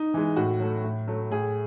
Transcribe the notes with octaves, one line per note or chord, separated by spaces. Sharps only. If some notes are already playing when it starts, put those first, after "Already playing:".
Already playing: D#4
E3 G#3
A2 F#4
F#3 A3
A2
F#3 A3
A2 G#4